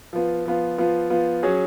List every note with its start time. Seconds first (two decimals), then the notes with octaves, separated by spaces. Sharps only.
0.13 F3 B3 F4
0.46 F3 B3 F4
0.78 F3 B3 F4
1.10 F3 B3 F4
1.43 F#3 C#4 G#4